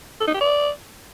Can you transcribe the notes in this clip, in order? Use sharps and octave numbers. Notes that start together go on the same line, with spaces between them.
A4
D#4
G4
D5